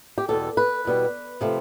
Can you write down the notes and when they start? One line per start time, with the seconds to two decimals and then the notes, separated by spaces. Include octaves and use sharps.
0.18 G4
0.28 E2 B2 G3 A4
0.57 B4
0.85 E2 B2 G3
1.41 C3 F3 A3